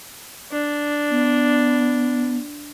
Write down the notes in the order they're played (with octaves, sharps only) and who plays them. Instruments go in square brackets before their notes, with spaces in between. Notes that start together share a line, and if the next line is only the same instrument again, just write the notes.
[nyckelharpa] D4
[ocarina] B3